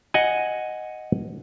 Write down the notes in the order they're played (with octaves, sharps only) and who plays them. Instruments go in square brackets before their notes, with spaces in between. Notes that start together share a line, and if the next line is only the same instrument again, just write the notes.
[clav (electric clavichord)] D#5 F#5 G#5